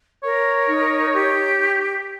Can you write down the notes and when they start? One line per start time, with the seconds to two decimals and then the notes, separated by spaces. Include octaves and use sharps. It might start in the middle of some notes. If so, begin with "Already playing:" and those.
0.23 A#4 C#5
0.68 D#4
1.12 G4